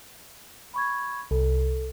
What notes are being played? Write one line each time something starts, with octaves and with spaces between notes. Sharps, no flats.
B5 C#6 G#6
C2 A4